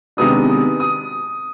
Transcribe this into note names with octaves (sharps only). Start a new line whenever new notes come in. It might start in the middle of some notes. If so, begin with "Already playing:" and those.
C3 D#3 G#3 B3 D4 D#6
D#6